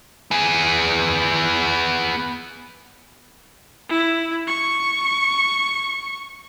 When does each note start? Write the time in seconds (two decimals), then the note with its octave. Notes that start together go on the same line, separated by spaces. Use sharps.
0.31 B3 G#4
3.89 E4
4.47 C#6